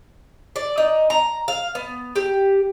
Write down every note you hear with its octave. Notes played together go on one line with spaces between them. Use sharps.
D5
D#4
A#5
F5
B3
G4